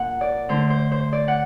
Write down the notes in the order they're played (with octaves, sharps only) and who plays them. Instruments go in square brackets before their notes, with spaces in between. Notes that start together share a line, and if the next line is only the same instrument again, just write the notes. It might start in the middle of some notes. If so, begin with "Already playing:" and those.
Already playing: [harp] A#2 D4 F#5
D5
D3 A3 D4 C5
C5
C5
D5
F#5